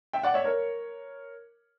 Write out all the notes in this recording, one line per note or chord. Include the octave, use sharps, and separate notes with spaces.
E5 G5
D5 F#5
C#5 E5
A#4 C#5